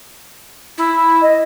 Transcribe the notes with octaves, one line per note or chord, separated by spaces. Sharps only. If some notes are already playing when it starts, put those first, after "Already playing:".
E4
D#5